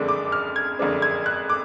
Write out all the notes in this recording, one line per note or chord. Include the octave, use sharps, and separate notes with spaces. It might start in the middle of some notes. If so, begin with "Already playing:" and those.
Already playing: F#1 F2 D3 G#3 D4
D6
F6
G#6
F#1 F2 D3 G#3 D4
G#6
F#6
D6